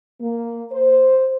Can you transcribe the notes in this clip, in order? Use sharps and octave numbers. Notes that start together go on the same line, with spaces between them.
A#3
C5